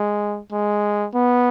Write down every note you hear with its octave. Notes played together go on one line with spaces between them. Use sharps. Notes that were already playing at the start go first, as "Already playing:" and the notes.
Already playing: G#3
G#3
B3